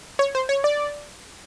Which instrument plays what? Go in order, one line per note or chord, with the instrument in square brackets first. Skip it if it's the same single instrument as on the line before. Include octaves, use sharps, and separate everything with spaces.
[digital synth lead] C#5
C5
C#5
D5